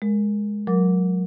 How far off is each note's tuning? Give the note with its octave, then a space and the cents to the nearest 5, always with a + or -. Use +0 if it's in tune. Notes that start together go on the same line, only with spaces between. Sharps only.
G#3 +0 A#4 +0
F#3 -20 A#4 +0 D6 -15